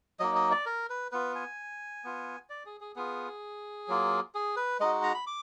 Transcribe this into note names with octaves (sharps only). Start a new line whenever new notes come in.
F#3 A#3 D#4 D#5
D#5
D5
A#4
B4
B3 F4 B4
G#5
B3 F4
D5
G#4
G#4
B3 F4 G#4
F#3 A#3 F4
G#4
B4
G#3 D#4 F#4 D#5
A#5
B5
D6